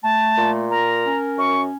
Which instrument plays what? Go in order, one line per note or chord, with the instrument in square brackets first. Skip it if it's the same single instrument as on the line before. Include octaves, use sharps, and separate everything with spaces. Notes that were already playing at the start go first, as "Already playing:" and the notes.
[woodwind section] A3 [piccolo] A5
[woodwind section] A#2
[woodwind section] A#4 [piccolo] A#5
[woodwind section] C#4
[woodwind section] F#2 [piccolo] C#6